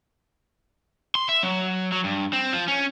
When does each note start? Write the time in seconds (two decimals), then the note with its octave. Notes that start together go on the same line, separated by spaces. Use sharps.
1.15 C6
1.29 E5
1.43 F#3
1.92 F#3
2.04 G2
2.33 C4
2.53 F3
2.68 C#4